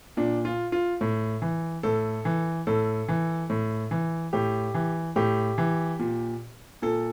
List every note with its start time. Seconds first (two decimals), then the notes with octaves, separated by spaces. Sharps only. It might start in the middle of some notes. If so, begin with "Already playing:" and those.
0.17 A#2 D4
0.45 F4
0.72 F4
1.01 A2
1.42 E3
1.83 A2 A4
2.25 E3
2.67 A2 A4
3.08 E3
3.50 A2
3.91 E3
4.33 A2 G4
4.74 E3
5.16 A2 G4
5.58 E3
5.99 A#2
6.82 A#2 A4